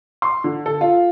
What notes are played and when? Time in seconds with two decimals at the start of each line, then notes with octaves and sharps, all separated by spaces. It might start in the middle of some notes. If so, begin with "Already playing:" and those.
0.22 C6
0.44 D3
0.66 A4
0.81 F4